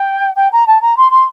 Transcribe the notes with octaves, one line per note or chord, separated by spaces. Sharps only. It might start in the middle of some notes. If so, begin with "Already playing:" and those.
Already playing: G5
G5
A#5
A5
A#5
C6
C6